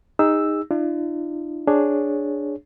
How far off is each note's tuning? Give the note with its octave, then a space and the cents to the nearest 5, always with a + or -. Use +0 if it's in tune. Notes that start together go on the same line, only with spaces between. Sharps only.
D#4 +0 G#4 -35 E6 +0
D4 +40 F4 -45
D4 +0 G#4 +0 C#5 +0